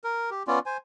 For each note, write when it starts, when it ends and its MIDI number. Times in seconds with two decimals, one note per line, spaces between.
0.04 0.30 70
0.31 0.43 67
0.47 0.59 59
0.47 0.59 61
0.47 0.59 65
0.47 0.59 74
0.66 0.77 72
0.66 0.77 80